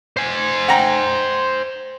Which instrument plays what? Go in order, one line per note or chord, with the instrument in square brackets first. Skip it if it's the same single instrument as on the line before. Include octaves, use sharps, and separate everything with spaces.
[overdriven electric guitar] C5 G#5
[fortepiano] F#5 G5 A#5